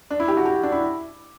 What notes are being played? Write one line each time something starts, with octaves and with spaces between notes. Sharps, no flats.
D4
E4
G4
F#4
G4
D4
E4